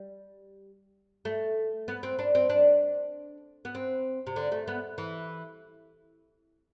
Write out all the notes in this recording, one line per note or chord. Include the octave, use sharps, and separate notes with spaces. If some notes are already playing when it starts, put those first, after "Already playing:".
Already playing: G3
A3
B3
C4
D4
C4
D4
B3
C4
C3
D3
A3
B3
E3